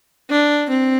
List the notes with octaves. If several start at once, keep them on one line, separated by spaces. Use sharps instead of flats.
D4
C4